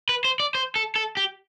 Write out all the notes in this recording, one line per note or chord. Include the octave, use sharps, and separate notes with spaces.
B4
C5
D5
C5
A4
A4
G4